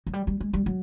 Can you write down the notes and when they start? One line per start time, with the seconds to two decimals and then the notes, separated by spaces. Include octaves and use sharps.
0.07 F#3
0.13 G3
0.27 G3
0.40 G#3
0.53 G3
0.66 F#3